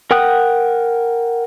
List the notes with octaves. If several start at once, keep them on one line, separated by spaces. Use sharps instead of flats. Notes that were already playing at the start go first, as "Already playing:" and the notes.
A#4 F#5 G5 D#6 F#6